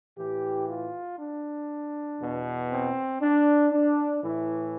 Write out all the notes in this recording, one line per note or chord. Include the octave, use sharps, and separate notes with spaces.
A2 E3 G4
F4
D4
E2 B2
C4
D4
D4
A2 E3 E4